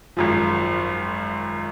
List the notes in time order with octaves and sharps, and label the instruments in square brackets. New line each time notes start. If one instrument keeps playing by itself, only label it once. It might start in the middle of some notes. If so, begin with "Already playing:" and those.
[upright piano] G#1 F#2 F3